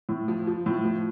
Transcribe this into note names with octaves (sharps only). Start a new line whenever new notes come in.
A2
F3
F3
A2
F3